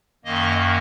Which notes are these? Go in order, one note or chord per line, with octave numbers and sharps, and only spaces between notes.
F#2 D#3 A#3 D#5